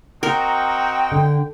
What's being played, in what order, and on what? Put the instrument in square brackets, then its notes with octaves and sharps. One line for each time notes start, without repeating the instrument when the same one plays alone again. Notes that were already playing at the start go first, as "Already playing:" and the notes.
[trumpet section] C4 D#4 F#4 [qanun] A#4 [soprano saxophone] G5
[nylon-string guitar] D3